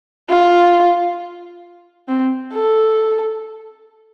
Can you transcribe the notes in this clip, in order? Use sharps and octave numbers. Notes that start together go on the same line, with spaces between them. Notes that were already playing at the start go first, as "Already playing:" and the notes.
F4
C4
A4